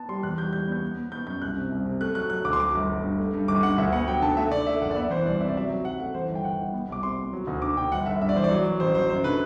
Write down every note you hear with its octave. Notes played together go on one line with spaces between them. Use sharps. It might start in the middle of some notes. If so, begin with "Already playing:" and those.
Already playing: B3 A5
G3 C6
E2 F#6
G3 G6
G3 G6
B3 G6
B3
B3
B3 G6
F#2 G6
C2 F#6
C3
C2
C3
A3 F#6
F#3 F#6
F#3 F#6
D2 D6
C6
F#3 D6
G1
G1
G2
A3
G2
G1 D6
G2 F#5
D2 E5
B3 F#5
F#3 G5
D3 A5
A3 E5
D3 D5
A3 E5
F#1 F#5
D5
B3 E5
E3 C5
C2 D5
C3 E5
D5
F#3 E5
F#3
F#3 F#5
A3 F#5
E3 C5
G1
G5
G1 F#5
G1
B3
C2 D6
C3 C6
B3
F#3
D2
D3 D6
D3 G5
G1 F#5
G1 E5
G2 E5
D5
E3 C5
D5
F#3
F#3
A1 C5
F#3 C5
F#2 C5
D3 B4